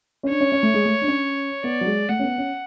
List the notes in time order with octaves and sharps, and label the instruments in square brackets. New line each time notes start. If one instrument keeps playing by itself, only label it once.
[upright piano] C#4
[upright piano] D4 [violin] C#5
[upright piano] C#4
C#4
A3
G#3
A3
D4
C#4
[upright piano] B3 [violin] D5
[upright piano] F#3
G#3
[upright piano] A3 [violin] F#5
[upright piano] C#4
B3
C#4